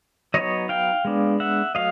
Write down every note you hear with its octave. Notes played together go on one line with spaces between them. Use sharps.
F#3 B3 D#4 C#5 D#5
F5 G5
G#3 B3 D4
E5 F#5
F#3 A3 D#5 F5